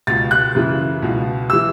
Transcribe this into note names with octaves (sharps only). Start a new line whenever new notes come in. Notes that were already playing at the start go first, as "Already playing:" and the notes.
C#2 B2 A6
F#6
F#2 C#3 E3
C#2 B2
E3 E6